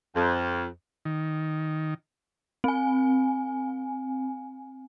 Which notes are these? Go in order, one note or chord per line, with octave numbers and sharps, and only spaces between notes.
F2
D#3
C4 G#5